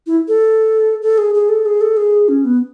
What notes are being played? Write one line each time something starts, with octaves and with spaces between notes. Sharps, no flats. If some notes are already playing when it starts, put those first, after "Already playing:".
E4
A4
A4
G#4
G#4
A4
G#4
A4
G#4
C#4
B3